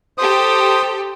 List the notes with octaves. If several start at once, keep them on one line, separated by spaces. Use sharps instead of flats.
G4 A4 C5 D#6